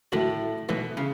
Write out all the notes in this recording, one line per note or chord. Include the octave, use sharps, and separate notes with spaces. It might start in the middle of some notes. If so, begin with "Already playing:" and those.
A2 D#3 A3 D#4 F#4
B2 E3 A3 D#4
C#3